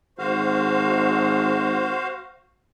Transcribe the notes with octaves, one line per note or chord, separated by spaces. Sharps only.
G#1 F#4 C5 F5